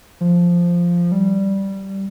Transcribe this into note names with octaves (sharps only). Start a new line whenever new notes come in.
F3
G3